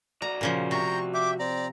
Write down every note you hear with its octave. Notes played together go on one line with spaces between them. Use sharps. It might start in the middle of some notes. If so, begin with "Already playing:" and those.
F#4 D5 A#5
A#2 C#3 F3
C3 G5 A#5 C#6 G6
E5 G5 D6
C4 D5 A#5